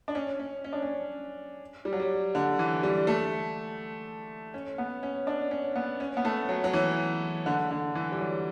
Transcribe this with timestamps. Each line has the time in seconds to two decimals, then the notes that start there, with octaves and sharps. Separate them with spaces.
0.08 D4
0.15 C#4
0.39 C#4
0.64 C#4
0.73 D4
0.82 C#4
1.85 G3
1.93 F#3
2.00 G3
2.35 D3
2.59 E3
2.83 G3
3.07 A3
4.54 C#4
4.78 B3
5.03 C#4
5.27 D4
5.51 C#4
5.76 B3
6.00 C#4
6.17 B3
6.25 A3
6.49 F#3
6.64 F#3
6.73 E3
7.46 D3
7.71 D3
7.95 E3
8.12 G3
8.20 F#3